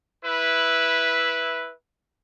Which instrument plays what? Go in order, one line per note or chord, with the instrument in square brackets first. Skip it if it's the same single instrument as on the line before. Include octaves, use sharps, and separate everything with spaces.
[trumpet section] E4 B4